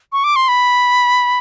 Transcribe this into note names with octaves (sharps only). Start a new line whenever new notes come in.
C#6
D6
C6
B5